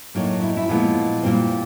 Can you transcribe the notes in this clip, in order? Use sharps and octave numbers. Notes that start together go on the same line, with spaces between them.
A2 F#3 A#3 D#4
E4
D#4
E4
A#2 F3 G#3 B3
A#2 G3 C4